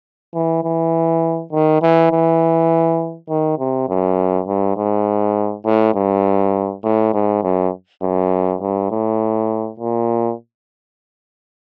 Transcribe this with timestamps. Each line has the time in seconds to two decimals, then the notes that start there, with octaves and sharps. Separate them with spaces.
0.34 E3
0.64 E3
1.52 D#3
1.82 E3
2.11 E3
3.29 D#3
3.58 C3
3.88 F#2
4.47 G2
4.77 G#2
5.65 A2
5.95 G2
6.84 A2
7.14 G#2
7.43 F#2
8.02 F#2
8.61 G2
8.91 A2
9.79 A#2